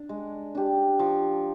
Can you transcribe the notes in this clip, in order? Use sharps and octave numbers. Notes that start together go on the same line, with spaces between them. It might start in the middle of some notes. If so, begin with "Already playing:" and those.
Already playing: D4
G#3
D4 G4
F3